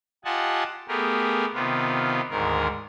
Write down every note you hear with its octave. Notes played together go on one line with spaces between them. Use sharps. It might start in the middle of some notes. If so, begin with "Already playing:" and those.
F4 G4 D#5 F#5 G#5 A5
A3 B3 G4 G#4 A#4
C3 D#3 B3 F4
D2 G#2 D#3 A#4